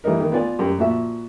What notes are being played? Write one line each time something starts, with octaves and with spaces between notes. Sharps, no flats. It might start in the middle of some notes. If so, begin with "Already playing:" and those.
E3 G3 A#3 D#4 A#4
D#3
B3 F4 D5 G#5
F#2 G4
A#2 F3 F#4 E5